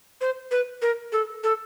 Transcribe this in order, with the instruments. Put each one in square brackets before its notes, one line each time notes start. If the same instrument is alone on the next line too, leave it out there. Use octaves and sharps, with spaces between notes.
[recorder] C5
B4
A#4
A4
A4